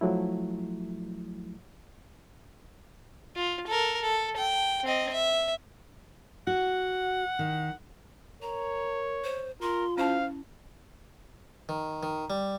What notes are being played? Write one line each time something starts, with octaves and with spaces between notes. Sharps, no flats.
F3 F#3 A3 E4
F4
A4 A#4
A4
G5
C4 D#5
E5
F#4 F#5
D#3
A#4 C#5 A#5
C5
F4 A#4 C6
C#4 E4 C5 F5 A5
D#3
D#3
G3